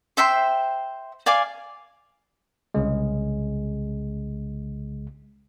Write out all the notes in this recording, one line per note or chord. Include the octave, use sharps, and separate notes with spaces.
C5 E5 G5 C6
D5 F5 G#5 D6
C2 C#3 G#3